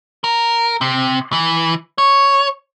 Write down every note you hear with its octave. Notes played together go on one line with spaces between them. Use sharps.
A#4
C3
E3
C#5